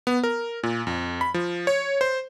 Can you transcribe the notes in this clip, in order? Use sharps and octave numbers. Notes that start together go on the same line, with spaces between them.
B3
A#4
A#2
F2
B5
F3
C#5
C5